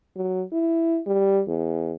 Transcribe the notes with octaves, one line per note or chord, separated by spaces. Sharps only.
F#3
E4
G3
E2